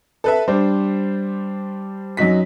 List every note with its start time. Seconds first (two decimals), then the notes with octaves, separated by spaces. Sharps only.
0.24 A4 B4 E5
0.48 G3 D4 C5
2.17 F#2 F#3 D#4 F#4 B6